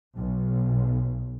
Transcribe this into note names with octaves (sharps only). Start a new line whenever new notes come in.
B1